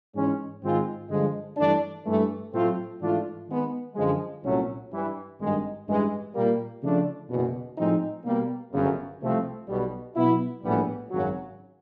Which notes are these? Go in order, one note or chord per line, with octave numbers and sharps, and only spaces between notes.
G#2 E3 G#3 C#4
G#2 D#3 G#3 C4 F4
G2 D3 F3 G#3
G2 E3 A3 D4
G2 E3 A3
A2 F#3 A3 C4 F4
G#2 E3 A3 D4 F4
D#3 G#3 B3
F#2 D3 F3 G#3
C2 A#2 F#3 A3 C#4
G2 E3 G3
G#1 G2 D#3 G#3
A1 G2 E3 G#3
A#2 G3 A#3
C#3 F3 A3 D4 F4
F#1 E2 B2
A2 F3 G#3 C4 D#4
B2 G3 A#3
G1 F#2 C#3
C2 C3 F3 A3 C4
B1 B2 G3
B2 F#3 B3 E4
A#1 A2 E3 G3 B3
G#1 F#2 C#3 F#3